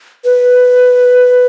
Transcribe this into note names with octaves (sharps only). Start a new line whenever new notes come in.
B4